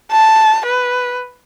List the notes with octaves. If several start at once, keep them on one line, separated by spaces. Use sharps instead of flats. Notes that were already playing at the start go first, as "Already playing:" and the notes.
A5
B4